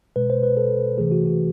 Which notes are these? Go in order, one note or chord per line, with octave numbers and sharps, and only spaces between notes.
B2 G#3 B4
C5
B4
A4
C3 E3 A3 G#4
F#4
F#4